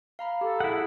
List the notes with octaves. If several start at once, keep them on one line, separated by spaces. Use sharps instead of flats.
F5 A#5 B5
G4 A4
E4 G#4 F#5